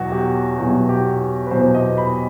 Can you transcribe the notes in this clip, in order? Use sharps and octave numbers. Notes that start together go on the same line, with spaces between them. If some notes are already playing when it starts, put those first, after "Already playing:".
Already playing: E2 B2 F#3 F#4
G4
E2 B2 F#3 G4
G4
B4
E2 B2 F#3 C5
D#5
B5